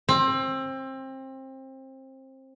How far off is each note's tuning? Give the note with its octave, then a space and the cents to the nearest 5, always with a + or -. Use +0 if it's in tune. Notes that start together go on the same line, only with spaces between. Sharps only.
C4 +25